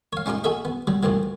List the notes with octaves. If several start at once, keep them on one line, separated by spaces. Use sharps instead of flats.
C#5 F5
C#4 D#4 F4 G4 D#5
F#4 G#4 A4 D#5 E5
B3
F#3 G3
C2 F2 A2 E3 F#3